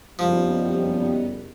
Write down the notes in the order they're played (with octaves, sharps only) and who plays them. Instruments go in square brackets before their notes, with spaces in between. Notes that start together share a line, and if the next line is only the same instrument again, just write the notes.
[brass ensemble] F#1 F2 G3 [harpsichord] F3 [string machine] B3 D#4